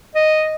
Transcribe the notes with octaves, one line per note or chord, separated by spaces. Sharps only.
D#5